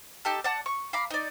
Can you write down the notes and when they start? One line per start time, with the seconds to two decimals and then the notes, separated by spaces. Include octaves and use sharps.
0.25 D#4 G4 A4
0.44 D5 F#5 A5
0.66 C#6
0.93 F5 A#5 B5 D6
1.10 D#4 D5